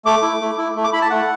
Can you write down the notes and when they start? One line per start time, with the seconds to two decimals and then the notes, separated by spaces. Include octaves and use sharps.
0.05 A3 D6
0.22 E4
0.41 A3
0.58 E4
0.76 A3
0.84 D6
0.93 E4 B5
1.02 A5
1.10 A3 F#5